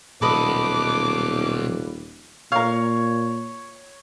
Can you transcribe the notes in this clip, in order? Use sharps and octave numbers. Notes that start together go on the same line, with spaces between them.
D#1 B1 B3 A4 B4 D#5 D6
A#2 A#4 C#5 F5